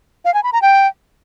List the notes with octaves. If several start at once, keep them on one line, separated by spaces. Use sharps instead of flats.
F5
G#5
B5
A#5
G5